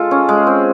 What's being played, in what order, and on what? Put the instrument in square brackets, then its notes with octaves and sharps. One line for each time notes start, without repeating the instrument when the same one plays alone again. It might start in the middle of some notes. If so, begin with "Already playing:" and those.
Already playing: [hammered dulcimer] G#3 F4 A4
C#4
G#3
C4